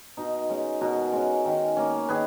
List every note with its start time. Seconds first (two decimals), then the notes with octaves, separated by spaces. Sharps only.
0.17 B2 D#4
0.49 G#3 C#4
0.81 B2 F#4 A#4
1.13 G#3 C#4
1.45 D#3
1.77 A#3 C#4
2.09 D#3 G#4 B4